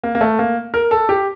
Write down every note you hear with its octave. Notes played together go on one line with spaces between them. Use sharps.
A#3
A#3
A3
A#3
A#4
A4
G4